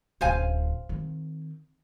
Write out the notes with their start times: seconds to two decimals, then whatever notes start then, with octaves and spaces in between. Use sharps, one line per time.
0.21 D1 C#3 C5 F5 G#5
0.89 D#3 C4